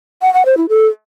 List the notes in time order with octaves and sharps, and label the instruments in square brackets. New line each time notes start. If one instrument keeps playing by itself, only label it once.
[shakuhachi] F#5
F#5
C5
E4
A4